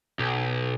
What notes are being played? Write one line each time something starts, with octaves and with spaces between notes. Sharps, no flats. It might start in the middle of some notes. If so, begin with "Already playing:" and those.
B1